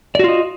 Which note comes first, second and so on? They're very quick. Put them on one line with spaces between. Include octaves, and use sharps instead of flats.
D5 F#4 F4 D#5